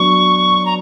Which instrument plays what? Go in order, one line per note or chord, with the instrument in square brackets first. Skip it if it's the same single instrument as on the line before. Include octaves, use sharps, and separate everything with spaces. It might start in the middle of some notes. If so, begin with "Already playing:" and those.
Already playing: [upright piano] F#3 B3 D4 [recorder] C#6
[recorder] A#5